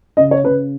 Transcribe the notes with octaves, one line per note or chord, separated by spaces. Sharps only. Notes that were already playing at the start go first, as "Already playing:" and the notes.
C#3 D#5
C#5
C#3 B4